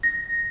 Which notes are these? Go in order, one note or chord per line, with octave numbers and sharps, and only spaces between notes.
A#6